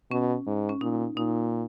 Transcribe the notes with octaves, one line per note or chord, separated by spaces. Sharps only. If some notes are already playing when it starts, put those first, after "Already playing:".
B2 C#4
G#2
C#4
A#2 D#4
A#2 D#4